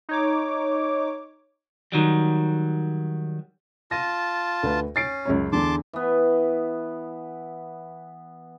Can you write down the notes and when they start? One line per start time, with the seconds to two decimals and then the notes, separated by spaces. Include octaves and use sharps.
0.09 D#4 C#5 D6
1.92 D#3 F#3 G3
3.91 F4 A5 A#6 D#7
4.63 D2 B4
4.96 C#4 A6 C7 D7
5.25 C#2 F#2 C#5
5.52 E2 D3 A5 C6 D6
5.93 E3 B3